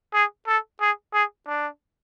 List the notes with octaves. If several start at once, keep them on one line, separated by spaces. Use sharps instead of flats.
G#4
A4
G#4
G#4
D4